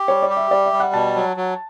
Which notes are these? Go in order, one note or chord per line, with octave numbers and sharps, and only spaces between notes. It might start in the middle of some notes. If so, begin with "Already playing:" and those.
Already playing: G4
G3 C#5
D5
G4
E5
G3 D5
E5
G3
F#5
B2 A5
F#3
F#3